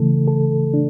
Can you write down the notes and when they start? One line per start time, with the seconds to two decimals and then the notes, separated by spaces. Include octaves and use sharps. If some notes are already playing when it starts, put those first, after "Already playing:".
Already playing: C#3 E3 A3 A4
0.27 A4
0.74 D4